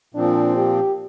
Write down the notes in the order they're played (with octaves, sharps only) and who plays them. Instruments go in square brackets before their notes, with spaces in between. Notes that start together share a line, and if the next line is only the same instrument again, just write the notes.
[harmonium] A#2 F3 C4 [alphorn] D4
[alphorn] G4